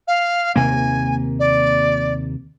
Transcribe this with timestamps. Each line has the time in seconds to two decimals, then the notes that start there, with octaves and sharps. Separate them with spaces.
0.07 F5
0.56 D#2 C3 A#3 G#5
1.39 D5